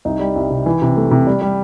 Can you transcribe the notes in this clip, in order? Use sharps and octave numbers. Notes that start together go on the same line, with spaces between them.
C2 D#4
G3
C2
C3
E3
C3
A3
C3
G3
G3